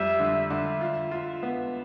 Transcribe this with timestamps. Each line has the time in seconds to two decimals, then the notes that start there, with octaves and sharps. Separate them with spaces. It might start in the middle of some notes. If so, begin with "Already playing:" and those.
Already playing: F2 G3 E5
0.20 D3
0.50 D3
0.81 F4
1.11 F4
1.43 B3